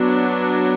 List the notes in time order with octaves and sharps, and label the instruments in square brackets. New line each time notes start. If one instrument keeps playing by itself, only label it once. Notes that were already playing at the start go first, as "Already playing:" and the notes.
Already playing: [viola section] F#3 B3 D4